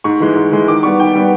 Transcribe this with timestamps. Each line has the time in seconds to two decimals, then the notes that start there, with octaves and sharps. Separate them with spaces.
0.04 G#2 C#6
0.20 E3 G#3
0.36 G#2
0.52 E3 G#3
0.68 D#3 D6
0.83 G3 B3 C#6
1.00 D#3 G5
1.15 G3 B3